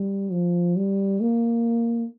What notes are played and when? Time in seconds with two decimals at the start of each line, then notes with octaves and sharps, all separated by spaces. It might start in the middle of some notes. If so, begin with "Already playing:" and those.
Already playing: G3
0.32 F3
0.76 G3
1.21 A#3